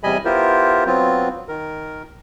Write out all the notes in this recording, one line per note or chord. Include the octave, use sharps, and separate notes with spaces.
E2 C3 G3 D#5 G#5 B5
B3 E4 F4 G4 A#4 C5
F#3 B3 C4 F4
D#3 A#4